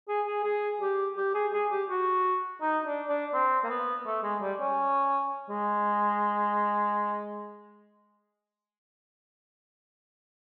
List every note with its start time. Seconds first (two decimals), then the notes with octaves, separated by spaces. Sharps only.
0.08 G#4
0.27 G#4
0.44 G#4
0.81 G4
1.17 G4
1.34 G#4
1.53 G#4
1.71 G4
1.89 F#4
2.61 D#4
2.85 D4
3.09 D4
3.34 C4
3.64 A#3
3.70 B3
4.06 A3
4.23 G#3
4.41 G3
4.60 C#4
5.49 G#3